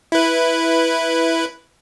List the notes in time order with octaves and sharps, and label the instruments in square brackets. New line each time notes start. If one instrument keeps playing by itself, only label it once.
[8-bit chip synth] E4 B4